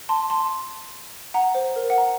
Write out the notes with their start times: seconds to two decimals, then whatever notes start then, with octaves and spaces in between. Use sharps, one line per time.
0.09 A5 C6
0.30 A5 C6
1.34 F#5 A#5
1.55 C5
1.76 A#4
1.90 F#5
1.98 A#5